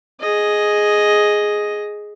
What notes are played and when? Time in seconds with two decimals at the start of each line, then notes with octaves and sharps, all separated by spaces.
0.20 G#4 D#5